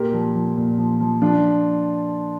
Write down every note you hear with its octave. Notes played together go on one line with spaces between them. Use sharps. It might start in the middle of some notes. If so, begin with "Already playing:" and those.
Already playing: A#2 G4 A#4
F3
F3
A#2
F3
F3
F3 D4 F4